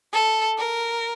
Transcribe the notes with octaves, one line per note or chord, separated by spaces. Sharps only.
A4
A#4